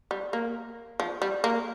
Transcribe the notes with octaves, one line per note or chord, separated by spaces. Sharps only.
G3
A#3
F3
G3
A#3